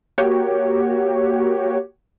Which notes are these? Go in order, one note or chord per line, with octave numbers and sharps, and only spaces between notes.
A#3 F#4 G4 C#5